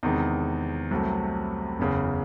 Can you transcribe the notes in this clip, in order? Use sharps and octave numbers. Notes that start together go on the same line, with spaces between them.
E2 C3 D#3 G#3
C2 C3 F#3 A3
F#1 E2 C#3